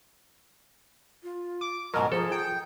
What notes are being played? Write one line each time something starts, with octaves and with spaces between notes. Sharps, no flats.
F4
D6
G#2 B2 F#3 A#4 D#5
F3 G#4 A4
G5